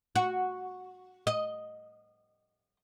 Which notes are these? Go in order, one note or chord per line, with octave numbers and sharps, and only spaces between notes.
F#4
D#5